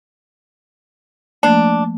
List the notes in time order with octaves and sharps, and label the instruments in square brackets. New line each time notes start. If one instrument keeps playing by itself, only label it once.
[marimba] F3 A3 A#3 [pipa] D4